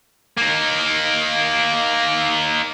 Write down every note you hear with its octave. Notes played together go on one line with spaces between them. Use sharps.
A#3 D#4